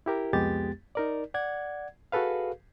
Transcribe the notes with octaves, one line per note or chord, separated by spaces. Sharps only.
E4 G4 A#4
C2 F2 G#3 B3 G4 A6
D#4 A#4 D5
D5 F#5 G#6
F#4 G#4 A4 B4 F5